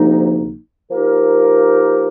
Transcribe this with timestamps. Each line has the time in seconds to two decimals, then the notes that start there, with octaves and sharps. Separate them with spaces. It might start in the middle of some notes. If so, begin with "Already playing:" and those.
Already playing: D2 C3 F3 A#3 D#4
0.91 F3 A#3 D#4 G4 A#4